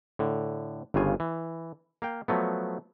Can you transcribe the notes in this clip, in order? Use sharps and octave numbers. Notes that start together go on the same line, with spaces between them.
A2 D3
G1 G2 C#3 F4 G#5
E3
A#3 F5 G5
F3 F#3 A3 B3